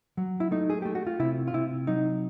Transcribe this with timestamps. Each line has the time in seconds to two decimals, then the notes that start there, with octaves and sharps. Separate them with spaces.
0.17 F#3
0.40 E4
0.51 A3 D#4
0.70 G#4
0.82 A3 G4
0.95 F#4
1.07 F4
1.19 C3 E4
1.47 F4
1.54 C3 E4
1.87 F#3 D#4